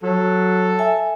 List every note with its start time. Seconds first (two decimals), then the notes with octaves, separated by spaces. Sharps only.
0.03 F#3 A4
0.79 E5 G#5